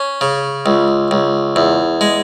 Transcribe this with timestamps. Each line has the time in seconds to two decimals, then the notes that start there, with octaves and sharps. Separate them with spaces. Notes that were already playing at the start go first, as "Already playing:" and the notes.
Already playing: C#4
0.21 C#3
0.66 C#2
1.11 C#2
1.56 E2
2.01 G#3